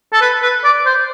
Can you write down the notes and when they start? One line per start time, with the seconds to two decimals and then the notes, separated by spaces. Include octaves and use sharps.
0.13 A4
0.21 B4
0.43 B4
0.64 D5
0.86 C5